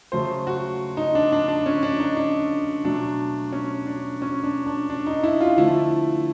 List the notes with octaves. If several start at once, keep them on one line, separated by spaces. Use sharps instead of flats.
C#3 F#3 A3 C5
F#4
D#4
D4
D4
D4
C#4
D4
D#4
D4
B2 F#3 A3 D4
C#4
D4
C#4
D4
D4
D4
D#4
E4
F4
D3 F3 A3 E4